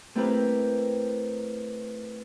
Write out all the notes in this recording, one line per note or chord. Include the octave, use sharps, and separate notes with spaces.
A3 C4 E4 G4 A#4 B4